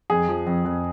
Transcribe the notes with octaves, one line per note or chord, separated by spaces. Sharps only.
F2 G#4
F3
F2
F2